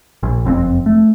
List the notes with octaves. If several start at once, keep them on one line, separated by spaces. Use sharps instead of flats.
A#1
F#1 F2 A#2 C4
A3